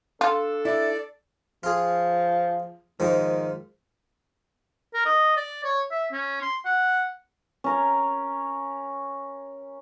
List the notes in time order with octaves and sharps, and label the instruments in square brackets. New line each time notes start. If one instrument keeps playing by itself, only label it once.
[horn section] D4 A4 [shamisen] F4
[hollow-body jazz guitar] E4 [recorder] D5
[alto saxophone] F3 [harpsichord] F4 G#4
[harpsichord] G#2 F3 [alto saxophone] D#3
[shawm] A#4
D#5
D5
C#5
E5
C#4
C6
F#5
[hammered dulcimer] C#4 A#4